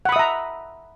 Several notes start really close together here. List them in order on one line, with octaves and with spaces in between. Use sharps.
F#5 B5 D#6 E5 A#5